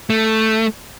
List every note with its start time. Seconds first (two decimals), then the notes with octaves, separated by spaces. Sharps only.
0.10 A3